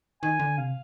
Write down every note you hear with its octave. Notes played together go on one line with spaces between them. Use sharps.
D#3 G#5
D3
C3 F5